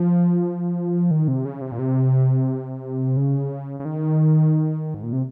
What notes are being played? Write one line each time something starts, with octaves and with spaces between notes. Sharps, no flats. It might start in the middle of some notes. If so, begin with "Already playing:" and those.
Already playing: F3
D#3
C3
C#3
C3
A#2
C3
C#3
C#3
D#3
G#2
A#2
C3